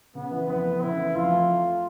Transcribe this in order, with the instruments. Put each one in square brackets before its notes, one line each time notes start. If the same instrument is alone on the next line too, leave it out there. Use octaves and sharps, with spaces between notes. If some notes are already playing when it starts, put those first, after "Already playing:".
[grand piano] C#3 [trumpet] B3
[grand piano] E3
[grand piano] F2 [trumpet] B3
[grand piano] A3
[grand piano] C#3 [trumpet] E4
[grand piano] E3
[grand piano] F2 [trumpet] F4
[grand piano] A3